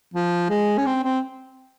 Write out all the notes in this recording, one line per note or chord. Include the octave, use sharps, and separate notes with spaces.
F3
G#3
C#4
C4
C4